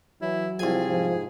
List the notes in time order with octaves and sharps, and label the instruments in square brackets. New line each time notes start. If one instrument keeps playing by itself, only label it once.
[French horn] E3 [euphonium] F#3 [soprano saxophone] E4
[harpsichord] C2 G#5 [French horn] F3 [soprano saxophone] G#4
[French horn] G#2 [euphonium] F3